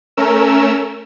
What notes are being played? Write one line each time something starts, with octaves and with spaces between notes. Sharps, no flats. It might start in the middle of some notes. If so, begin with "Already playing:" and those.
A3 C#4 A#4 E6 E7